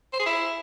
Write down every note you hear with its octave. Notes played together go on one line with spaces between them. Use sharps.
C5
G#4
E4